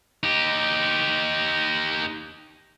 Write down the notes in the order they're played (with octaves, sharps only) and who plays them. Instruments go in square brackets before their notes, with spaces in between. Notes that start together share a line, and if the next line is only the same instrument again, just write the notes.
[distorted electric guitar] D#4 G4